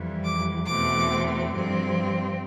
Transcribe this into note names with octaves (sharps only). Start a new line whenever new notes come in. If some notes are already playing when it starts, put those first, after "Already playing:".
Already playing: F2 E3 G3
D6
E2 B2 A3 C4 D6
G2 F3 C4